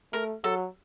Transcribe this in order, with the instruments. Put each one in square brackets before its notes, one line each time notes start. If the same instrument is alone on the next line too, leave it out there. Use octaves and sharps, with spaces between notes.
[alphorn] A3 [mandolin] A#4
[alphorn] F#3 [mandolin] A4